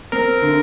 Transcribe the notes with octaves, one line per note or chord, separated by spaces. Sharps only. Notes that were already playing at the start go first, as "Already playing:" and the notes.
C4 A#4
D3